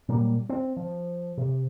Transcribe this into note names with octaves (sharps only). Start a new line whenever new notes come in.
A#2 F#3 G3 A#3
C4
F3
C3